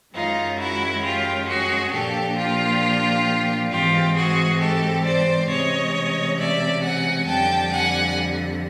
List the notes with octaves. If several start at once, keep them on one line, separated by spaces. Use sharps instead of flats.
F#2 D#3 G#3 C#4 D#4 F4
E4 F#4
F4 G4
F#4 G#4
A#2 F3 A#3 D4 G4 A4
F4 G4
G#2 E3 G#3 C4 F4 G4
F#4 G#4
G4 A4
C5 D5
C3 E3 G#3 C#4 C#5 D#5
D5 E5
F#5 G#5
F2 D3 G3 G5 A5
F#5 G#5